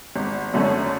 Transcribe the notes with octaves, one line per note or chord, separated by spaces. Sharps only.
G#1
F#2 D3 A3 C#4